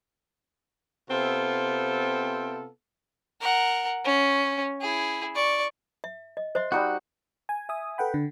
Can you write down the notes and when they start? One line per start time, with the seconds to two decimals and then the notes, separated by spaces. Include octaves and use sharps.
1.09 C3 B3 C4 F4 A4
3.41 A#4 F#5
4.05 C#4
4.81 E4 G#4
5.35 D5 C#6
6.04 E5
6.37 D#5
6.55 C5 D#5 E5 C6
6.72 G3 D#4 F#4 B4
7.49 G#5
7.69 E5 G#5 D#6
7.98 A4 B4 F#5 G5 B5
8.14 D3